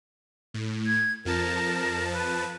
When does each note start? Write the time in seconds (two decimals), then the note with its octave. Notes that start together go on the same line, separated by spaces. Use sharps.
0.54 A2
0.87 G#6
1.25 F2 F3 A#4 A5
2.13 B4